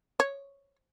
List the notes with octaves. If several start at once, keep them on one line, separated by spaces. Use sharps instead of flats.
C#5